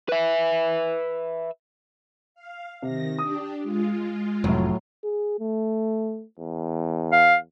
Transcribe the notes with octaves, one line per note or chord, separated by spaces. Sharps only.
B4 E5
F5
C3 D#3 A#6
D4 G4 D#6
G#3 F4
F1 A2 F#3
G#4
A3
E2
F5